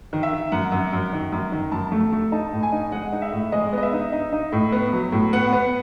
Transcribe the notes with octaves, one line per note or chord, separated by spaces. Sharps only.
D#3
E5
D#3
F#2 F#5
F#2
F#2
D#3
F#2
D#3
F#2 A5
A3
A3
D#4 A5
A2
G#5
D#4
G#3 F#5
D#4
E5
A2
G#3 D#5
B3 D#5
E5
D#4
D#4
D#4
A2
B3
F#3
A2
B3 F#5
B3